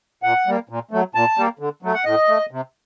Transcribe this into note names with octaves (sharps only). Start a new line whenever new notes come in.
A#2 F#5
G3 A#3
A#2
F#3 A3
A#2 A5
G3 A#3
D3
F#3 A3
F#5
A2 D#5
A3
C3